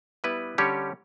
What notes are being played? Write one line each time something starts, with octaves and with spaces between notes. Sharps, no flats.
G3 B3 E4 B4
D3 G3 C#4 G4 C#5